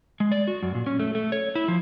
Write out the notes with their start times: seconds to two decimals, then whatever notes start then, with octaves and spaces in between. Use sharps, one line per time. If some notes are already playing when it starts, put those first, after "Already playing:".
0.20 G#3
0.32 D5
0.48 F#4
0.62 F#2
0.75 A#2
0.87 C#4
1.00 A3
1.15 A3
1.32 C#5
1.55 E4
1.68 F3